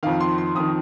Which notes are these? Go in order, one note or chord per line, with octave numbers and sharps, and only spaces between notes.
F2 D#3 F5
C6
C6
F2 D#3 D#6